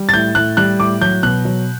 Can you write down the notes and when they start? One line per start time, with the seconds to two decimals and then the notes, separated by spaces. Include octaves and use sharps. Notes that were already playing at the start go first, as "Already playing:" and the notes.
Already playing: G3
0.09 A6
0.14 A2 G6
0.35 A2 F#6
0.57 G3 F#6
0.80 A2 D6
1.01 F#3 G6
1.23 B2 F#6
1.45 F#3